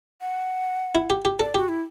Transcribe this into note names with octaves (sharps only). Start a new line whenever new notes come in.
F#5
E4
G4
G4
A4 D5
F#4 G4
E4